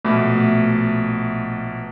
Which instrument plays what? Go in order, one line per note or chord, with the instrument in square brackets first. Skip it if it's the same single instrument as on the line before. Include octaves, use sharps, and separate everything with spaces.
[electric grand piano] A#1 B2 [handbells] A3